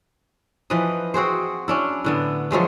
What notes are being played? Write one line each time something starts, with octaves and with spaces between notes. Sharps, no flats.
E3 F3 B4 D#5
C4 F#4 G#4 C5
C#4 D4 E4
A2 D3 B3
F3 F#3 G#3 A3